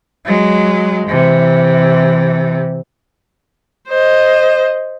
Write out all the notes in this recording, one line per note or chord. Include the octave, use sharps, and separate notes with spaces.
F#3 G#3
C3 E3
C5 D#5